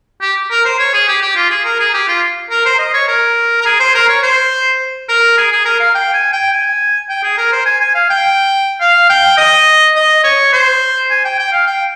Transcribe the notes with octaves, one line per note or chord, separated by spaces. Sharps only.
G4
A#4
C5
C#5
G#4
G4
G4
F4
G#4
A#4
G#4
G4
F4
A#4
C5
D#5
C#5
A#4
A#4
G#4
C5
A#4
C#5
C5
A#4
G#4
G#4
A#4
F5
G5
G#5
G5
G#5
G5
G#4
A#4
C5
G#5
G#5
F5
G5
F5
G5
D#5
D#5
C#5
C5
G#5
G5
G5
F5
G5